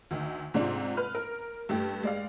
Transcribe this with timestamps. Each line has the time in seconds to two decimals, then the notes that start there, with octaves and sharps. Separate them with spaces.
0.11 D2 D#3
0.54 G#2 C3 C4 D4 F4
0.97 B4 F6
1.15 A#4
1.69 G2 A3 G4
2.03 G#3 D5 F5